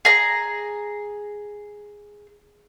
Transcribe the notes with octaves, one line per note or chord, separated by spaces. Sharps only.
G#4 A#5